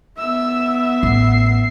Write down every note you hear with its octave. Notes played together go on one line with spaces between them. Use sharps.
B3 E5 E6
A1 C7